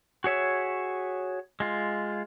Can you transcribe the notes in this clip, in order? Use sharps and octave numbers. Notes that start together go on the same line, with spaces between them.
F#4 G#4 C#5 E5
G#3 F4